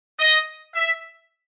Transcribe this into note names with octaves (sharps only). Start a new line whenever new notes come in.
D#5
E5